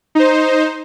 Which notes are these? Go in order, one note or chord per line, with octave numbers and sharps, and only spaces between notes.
D#4 C5